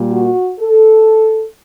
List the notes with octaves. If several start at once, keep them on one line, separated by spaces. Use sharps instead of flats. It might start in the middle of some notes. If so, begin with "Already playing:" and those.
Already playing: A#2 G3 A#3
F#4
A4